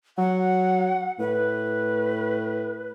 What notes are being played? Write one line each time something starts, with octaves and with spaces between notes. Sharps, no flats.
F#3 F#5
A2 B4